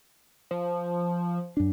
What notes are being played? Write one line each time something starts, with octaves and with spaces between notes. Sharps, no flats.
F3
F#2 D4